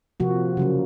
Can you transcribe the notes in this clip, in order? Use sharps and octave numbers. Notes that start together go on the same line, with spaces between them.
C3 F3 A#3 F#4
C#3 F#3 A#3